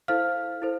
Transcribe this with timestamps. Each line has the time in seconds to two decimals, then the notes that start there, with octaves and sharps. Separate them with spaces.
0.08 E4 A4 C5 F5 F6
0.62 E4 A4 C5